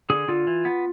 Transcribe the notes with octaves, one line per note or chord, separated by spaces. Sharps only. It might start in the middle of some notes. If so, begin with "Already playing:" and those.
D3 G#4
D3 F4
E3
B3